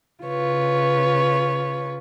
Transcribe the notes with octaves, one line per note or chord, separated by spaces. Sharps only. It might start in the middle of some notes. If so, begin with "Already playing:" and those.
C#3 F4 B4 C#5